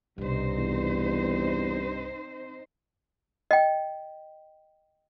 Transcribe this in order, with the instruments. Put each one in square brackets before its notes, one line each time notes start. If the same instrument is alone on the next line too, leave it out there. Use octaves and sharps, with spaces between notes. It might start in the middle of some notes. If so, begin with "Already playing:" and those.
[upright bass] C2 B2 [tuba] G2 [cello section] C4 D#4 C5
[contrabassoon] E2
[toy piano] D#5 G5